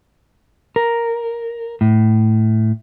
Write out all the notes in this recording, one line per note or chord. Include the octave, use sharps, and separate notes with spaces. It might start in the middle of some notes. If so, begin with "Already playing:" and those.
A#4
A2